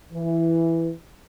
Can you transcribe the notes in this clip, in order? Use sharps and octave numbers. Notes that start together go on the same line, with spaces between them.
E3